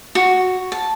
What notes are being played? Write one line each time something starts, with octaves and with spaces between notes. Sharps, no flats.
F#4
A5